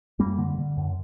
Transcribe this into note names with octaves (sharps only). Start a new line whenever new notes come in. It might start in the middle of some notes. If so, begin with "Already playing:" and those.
F#2 G3 A#3
D3
D3
F#2